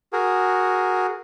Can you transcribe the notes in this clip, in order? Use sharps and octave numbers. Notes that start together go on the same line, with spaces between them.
F#4 G#4 A#4